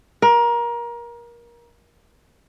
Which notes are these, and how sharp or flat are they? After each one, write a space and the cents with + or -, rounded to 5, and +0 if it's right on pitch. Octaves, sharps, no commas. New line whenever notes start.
A#4 +25